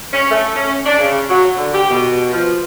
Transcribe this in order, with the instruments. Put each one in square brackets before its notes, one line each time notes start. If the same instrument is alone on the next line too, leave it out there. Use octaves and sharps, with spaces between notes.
[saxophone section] C#4
A3
C#4
D4
C#3
F#3
D3
G4
B2
F3